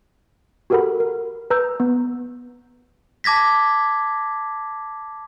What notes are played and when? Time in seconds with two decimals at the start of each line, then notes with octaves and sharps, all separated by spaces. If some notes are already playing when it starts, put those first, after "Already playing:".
0.70 F#4 G4 A4 A#4 F#5 B5
1.00 A#4
1.50 B4 A#5 E6 G6
1.80 B3
3.24 A5 D6 G#6 A#6 B6